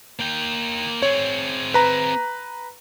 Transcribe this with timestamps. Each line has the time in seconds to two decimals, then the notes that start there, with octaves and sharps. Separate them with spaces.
0.19 A#3 G5
1.02 C4 G#4 C#5
1.74 B4 A#5